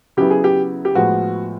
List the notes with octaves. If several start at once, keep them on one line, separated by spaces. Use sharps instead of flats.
C#3 F#3 B3 E4 G4
G#4
G4
G4
A2 F3 G#3 B3 F#4